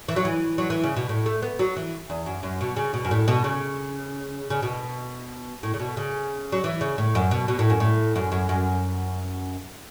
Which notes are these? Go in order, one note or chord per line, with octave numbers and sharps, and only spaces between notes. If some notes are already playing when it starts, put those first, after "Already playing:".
E3
F#3
E3
F#3
E3
C#3
B2
A2
A3
B3
F#3
E3
E2
F#2
F#2
B2
C#3
B2
F#2
A2
B2
C#3
C#3
B2
A2
C#3
B2
C#3
F#3
E3
C#3
A2
F#2
B2
B2
A2
F#2
A2
F#2
F#2
F#2